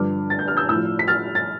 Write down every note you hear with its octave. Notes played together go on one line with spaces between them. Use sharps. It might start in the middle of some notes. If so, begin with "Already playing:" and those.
Already playing: G2 D3 F3 D6 F6
A6
G6
F6
E6 G6
A2 F3 E6 G6
B6
F6 A6
A6